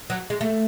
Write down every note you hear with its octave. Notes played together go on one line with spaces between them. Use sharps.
F#3
G#3
A3